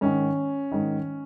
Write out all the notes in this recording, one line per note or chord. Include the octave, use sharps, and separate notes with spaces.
G#2 D#3 C#4
G#2 D#3